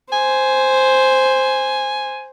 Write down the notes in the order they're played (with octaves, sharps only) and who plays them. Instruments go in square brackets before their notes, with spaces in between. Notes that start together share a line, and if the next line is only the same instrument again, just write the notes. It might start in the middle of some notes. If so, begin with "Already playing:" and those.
[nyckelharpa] C5 [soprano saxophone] G#5